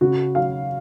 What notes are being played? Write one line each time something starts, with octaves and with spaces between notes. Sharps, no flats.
C#3 F#4
F#3 F5